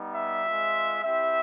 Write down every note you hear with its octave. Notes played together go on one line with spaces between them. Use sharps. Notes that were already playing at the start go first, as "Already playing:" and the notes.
Already playing: G3 B3 D#4
E5
G#3 C4 F4
C4 E4 G4 E5